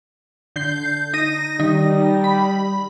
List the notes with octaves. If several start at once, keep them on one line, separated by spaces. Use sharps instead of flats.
D3 G6 C7
D#4 A#6 D#7
D#3 G3 D#4
B5